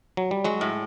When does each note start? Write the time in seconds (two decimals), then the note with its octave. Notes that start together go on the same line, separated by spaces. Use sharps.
0.17 F#3
0.31 G3
0.44 F#3 G#3
0.61 A2